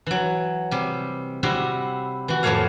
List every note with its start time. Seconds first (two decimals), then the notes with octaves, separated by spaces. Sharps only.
0.06 E3 F#3
0.71 C3 G3
1.43 C3 G3 E4 F#4 A#5 C6
2.28 E3 F#4
2.43 F2 A2 A3 A#3 C#5 F5